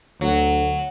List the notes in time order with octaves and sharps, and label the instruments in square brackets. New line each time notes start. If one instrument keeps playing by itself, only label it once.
[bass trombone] D2 [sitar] F#3